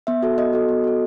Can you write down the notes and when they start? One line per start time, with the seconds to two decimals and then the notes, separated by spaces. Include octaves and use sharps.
0.07 B3 E5
0.23 F#4 A4
0.38 B3 D#5
0.53 F#4 A4
0.69 B3
0.84 F#4 A4